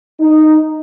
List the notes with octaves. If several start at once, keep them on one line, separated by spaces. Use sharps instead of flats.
D#4